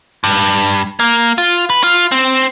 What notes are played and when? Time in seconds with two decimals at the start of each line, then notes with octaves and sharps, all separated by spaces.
0.24 G2
1.00 A#3
1.38 F4
1.70 B4
1.83 F4
2.12 C4